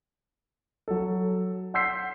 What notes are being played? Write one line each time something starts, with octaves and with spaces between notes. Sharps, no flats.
F#3 A4
F#5 C6 E6 G6 B6 C7